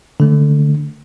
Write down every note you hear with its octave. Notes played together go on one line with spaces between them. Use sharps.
D3 A3